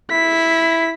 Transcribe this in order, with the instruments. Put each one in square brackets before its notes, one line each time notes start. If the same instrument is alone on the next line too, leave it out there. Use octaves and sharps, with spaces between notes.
[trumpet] E4 [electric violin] B6